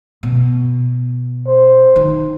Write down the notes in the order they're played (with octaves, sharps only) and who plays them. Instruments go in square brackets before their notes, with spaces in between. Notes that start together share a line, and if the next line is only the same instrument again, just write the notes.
[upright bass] B2
[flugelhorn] C5
[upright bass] D#3